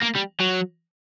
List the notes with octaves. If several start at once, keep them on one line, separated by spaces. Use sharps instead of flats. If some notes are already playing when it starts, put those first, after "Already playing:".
A#3
G3
F#3